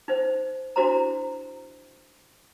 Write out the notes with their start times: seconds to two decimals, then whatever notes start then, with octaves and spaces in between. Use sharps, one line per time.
0.08 D#4 C5
0.76 D4 E4 F#4 C5 A#5